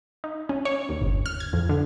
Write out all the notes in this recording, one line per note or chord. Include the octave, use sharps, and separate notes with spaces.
D#4
C#4
C#5
D#2
G1
F6
G#6
F2
D3